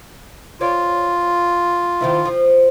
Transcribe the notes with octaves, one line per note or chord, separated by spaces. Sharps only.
F4 C#5 D5
D#3 F3 E4
F3